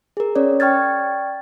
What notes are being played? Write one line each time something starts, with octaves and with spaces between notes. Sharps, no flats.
G#4 A#4
C#4 C#5 D5
D5 G5 C#6 F6 G#6 A6